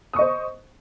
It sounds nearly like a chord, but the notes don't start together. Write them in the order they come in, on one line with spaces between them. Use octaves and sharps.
D#6 C#6 D#5 C5